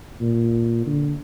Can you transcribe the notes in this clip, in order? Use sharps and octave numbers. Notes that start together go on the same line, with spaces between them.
A#2
D3